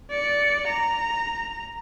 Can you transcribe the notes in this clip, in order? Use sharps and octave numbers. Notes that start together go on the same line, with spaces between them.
D5 C#7
A#5